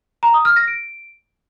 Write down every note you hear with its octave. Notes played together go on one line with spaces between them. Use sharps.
A#5
D#6
F6
A#6
D7